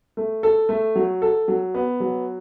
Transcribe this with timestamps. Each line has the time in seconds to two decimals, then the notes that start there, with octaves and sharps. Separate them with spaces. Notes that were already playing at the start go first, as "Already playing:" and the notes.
0.17 A3
0.43 A4
0.69 A3
0.96 F#3
1.22 A4
1.48 F#3
1.74 B3
2.00 F#3